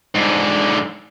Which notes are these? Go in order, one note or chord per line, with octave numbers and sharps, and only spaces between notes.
G#2 D3